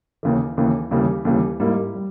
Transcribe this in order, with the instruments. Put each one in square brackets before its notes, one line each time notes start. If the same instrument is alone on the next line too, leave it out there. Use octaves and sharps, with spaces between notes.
[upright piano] D#2 C#3 E3
D#2 C#3 E3
D#2 C#3 E3 G3
D#2 C#3 E3 G3
G#2 G3 A#3 E4
G3